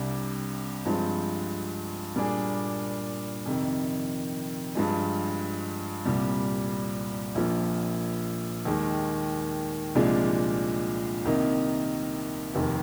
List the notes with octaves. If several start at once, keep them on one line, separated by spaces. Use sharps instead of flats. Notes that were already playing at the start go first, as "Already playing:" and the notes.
Already playing: C2 C3 G3 D4
G2 F3 G#3 C4
A#2 G3 A#3 D4 G#4
F2 C3 D#3
G2 F3 G#3
C2 A#2 G3
A#1 A#2 F3 A#3
D#2 D#3 G#3
C2 A#2 F3 G#3 D4
C2 C3 D#3 A#3 D#4
F1 D#2 D#3 A#3